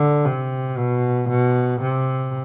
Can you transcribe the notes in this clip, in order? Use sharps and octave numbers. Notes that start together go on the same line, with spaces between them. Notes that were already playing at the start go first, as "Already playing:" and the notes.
Already playing: D3
C3
B2
B2
C3